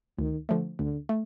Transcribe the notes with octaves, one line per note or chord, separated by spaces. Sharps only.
D2 D#3
D3 F3 A3
D2 D3
A3